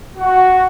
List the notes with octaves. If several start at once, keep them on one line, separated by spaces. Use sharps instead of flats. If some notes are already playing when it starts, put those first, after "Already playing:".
F#4